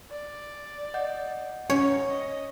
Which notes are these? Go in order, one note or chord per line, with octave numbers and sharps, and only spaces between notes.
D5
D#5 F#5 G6
C#4 D#4 C#5
D#5